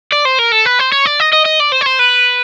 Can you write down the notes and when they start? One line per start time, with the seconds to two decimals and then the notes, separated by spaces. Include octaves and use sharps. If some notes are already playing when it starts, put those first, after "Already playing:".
0.12 D5
0.25 C5
0.39 A#4
0.52 A4
0.66 B4
0.80 C5
0.92 C#5
1.05 D5
1.20 D#5
1.32 D#5
1.45 D#5
1.60 D5
1.72 C5
1.81 C#5
1.86 C5
1.99 B4